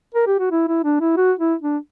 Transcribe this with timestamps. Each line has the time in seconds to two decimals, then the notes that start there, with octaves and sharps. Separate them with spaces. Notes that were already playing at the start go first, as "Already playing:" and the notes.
0.14 A#4
0.27 G4
0.39 F#4
0.51 E4
0.68 E4
0.84 D4
1.00 E4
1.17 F#4
1.39 E4
1.62 D4